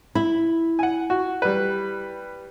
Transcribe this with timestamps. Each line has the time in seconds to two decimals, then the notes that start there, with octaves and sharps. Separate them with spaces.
0.15 E4 B5
0.79 F#5 G#5
1.10 F#4
1.42 G3 B4